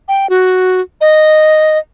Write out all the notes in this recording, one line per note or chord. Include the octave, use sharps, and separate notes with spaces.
G5
F#4
D#5